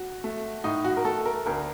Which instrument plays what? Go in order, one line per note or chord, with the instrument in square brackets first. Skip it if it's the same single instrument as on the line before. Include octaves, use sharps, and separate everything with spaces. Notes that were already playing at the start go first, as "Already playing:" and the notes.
Already playing: [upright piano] F#4
A3
A2 D#4
F#4
A#4
A3 A4
A#4
D2 A#4